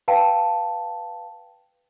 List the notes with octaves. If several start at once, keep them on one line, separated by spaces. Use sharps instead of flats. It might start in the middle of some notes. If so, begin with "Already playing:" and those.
B4 F5 G5 A5